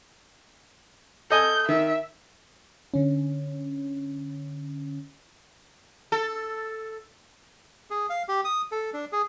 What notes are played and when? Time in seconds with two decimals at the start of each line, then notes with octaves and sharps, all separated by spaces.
1.30 A4 D#5 G#5 G6
1.69 D#3 E5
2.94 D3 C#4
6.12 A4
7.90 G#4
8.10 F5
8.28 G4
8.45 D#6
8.72 A4
8.94 D4
9.12 G#4